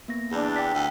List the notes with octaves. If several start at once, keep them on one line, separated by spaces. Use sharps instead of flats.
A#3 B3 A#6
E2 D4
G5 B6
D2